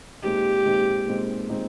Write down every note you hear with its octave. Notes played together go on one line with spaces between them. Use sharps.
A#2 G#3 C4 D#4 G4
A#2 G#3 C4 D#4
A#2 G#3 C4 D#4
A#2 G#3 C4 D#4